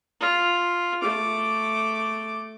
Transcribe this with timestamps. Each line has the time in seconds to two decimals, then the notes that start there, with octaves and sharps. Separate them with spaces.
0.21 F4
1.02 A3 D6